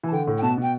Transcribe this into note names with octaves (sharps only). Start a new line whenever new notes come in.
E3
A5
D3 G5
A2
G5
B2 A5
B2 G5